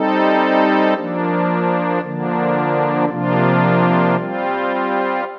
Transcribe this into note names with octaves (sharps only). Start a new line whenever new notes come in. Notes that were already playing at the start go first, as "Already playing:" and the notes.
Already playing: G3 C4 D#4 A4
F3 A#3 D4
D3 F3 A#3 D4
C3 F3 A#3 D4 F4
G3 C4 F4